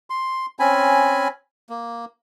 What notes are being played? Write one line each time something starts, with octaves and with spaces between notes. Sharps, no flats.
C6
C4 C#4 G#5 B5
A#3